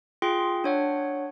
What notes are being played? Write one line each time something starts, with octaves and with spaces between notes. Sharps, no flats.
F4 G#4 G5 C6
D4 C#5 F#5